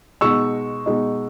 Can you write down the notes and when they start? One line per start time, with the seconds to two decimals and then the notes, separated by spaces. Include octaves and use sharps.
0.21 B2 G#3 D#4 C#6 E6
0.86 B2 G#3 D#4